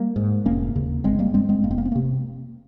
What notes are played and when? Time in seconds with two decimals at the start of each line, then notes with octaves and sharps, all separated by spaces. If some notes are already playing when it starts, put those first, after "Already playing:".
Already playing: G3 A#3
0.16 G#2
0.46 F1 A#3 C#4
0.75 D#2 C#3
1.04 G1 G#3 C4
1.19 G3 A#3
1.34 G2 G#3 C4
1.49 G#3 C4
1.63 F1 A#3
1.71 C4
1.78 A#3
1.85 C4
1.92 A#3
1.96 C3